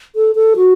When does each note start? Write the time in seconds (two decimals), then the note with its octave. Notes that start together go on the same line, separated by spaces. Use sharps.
0.16 A4
0.35 A4
0.56 F#4